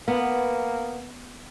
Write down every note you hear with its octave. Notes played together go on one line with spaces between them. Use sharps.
A#3 B3